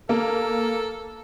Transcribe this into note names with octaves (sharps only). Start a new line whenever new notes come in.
A#3 A4